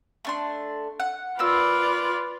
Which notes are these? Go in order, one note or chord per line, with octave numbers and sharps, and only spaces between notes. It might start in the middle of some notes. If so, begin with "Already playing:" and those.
A3 D4 C6
F#5
A#3 F4 B4 D5 E6